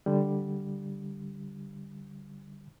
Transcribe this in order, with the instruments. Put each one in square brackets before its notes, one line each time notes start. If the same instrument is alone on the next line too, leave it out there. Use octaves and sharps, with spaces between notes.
[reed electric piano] D3 G3